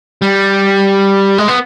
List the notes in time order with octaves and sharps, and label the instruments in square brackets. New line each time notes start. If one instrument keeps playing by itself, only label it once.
[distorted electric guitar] G3
G#3
B3